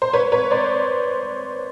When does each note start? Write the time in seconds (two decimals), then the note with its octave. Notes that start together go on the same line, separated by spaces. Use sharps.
0.02 C5
0.13 B4 C#5
0.32 B4 C#5
0.51 C5 D5